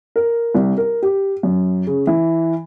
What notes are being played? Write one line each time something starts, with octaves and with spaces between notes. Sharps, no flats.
A#4
C2
A#4
G4
F#2
C#3
E3